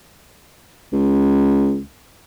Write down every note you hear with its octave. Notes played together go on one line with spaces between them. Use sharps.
C#2